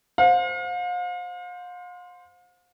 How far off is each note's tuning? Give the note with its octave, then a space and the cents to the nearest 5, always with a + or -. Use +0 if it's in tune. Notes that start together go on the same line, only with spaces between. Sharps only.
C5 -5 F5 +40